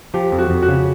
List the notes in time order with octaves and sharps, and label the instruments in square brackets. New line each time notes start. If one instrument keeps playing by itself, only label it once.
[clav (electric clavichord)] F3 [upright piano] G4
[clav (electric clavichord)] F2
[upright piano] F#4
[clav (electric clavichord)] F2
[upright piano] F#4
[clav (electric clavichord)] C#3